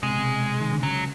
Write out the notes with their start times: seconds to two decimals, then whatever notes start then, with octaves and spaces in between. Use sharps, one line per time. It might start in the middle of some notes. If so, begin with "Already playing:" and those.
0.03 C3 G#3
0.11 B2
0.18 C3
0.61 D#3
0.72 D3
0.83 C#3 F#3